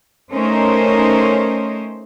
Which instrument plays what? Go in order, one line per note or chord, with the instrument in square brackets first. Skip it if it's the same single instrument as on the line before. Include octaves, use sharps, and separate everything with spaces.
[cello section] A3 C#4 D#4 A#4 C5